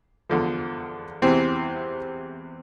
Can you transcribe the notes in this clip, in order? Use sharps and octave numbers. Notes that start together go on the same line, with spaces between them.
E2 D3 F3
E2 C3 E3 C4